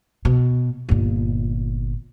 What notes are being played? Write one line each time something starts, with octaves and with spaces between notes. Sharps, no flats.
B2
G1 A#2